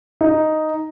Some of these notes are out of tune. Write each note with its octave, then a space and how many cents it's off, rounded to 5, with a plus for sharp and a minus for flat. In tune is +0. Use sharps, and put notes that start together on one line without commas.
D#4 +0